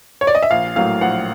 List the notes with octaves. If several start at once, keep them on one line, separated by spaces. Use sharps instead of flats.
C#5
D5
D#5
E5
A#1 F5
A2 F#3 A#3 F5
A#1 F#5